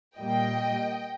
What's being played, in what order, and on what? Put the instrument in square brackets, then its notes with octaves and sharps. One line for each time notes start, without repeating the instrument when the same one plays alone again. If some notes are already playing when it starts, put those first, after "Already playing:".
[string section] A#2 G3 A#3 D#5 G5